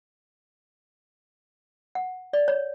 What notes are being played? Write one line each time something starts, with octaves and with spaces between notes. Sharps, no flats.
F#5
D5
C#5